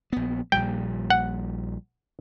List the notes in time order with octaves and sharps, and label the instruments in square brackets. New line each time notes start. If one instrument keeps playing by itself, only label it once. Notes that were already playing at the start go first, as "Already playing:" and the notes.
[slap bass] A#1 B3
[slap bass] A#1 A#2 G3 [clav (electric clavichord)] G5
[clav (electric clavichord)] F#5